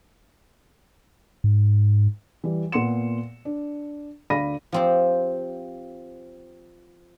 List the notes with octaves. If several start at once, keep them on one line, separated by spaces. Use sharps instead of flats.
G#2
E3 G3
A#2 B3 F#5 C6 C#7 E7
D4
D2 D5 F5 B5 A#6 D#7
F3 C4 G4